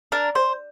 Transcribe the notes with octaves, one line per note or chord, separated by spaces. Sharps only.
D4 A#4
C5